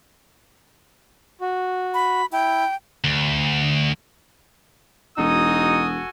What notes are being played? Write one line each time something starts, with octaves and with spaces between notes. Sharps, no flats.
F#4
B5
E4 G5
D2
E1 D#4 F#4 A4 G#5 D#6